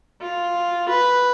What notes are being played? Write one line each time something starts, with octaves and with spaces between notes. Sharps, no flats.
F4
B4